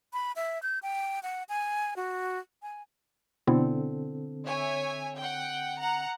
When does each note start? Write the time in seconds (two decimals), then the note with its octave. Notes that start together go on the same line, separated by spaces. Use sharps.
0.13 B5
0.36 E5
0.63 G6
0.83 G5
1.23 F#5
1.49 G#5
1.96 F#4
2.62 G#5
3.47 B2 D3 B3 C4 E4 A4
4.46 C#5 E5 G#5
5.16 F#5 G5
5.80 F#5 A#5